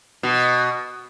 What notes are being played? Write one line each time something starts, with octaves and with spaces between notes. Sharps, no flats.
B2